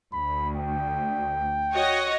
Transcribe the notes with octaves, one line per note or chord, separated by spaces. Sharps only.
D2 B5
G5
F#4 C#5 D#5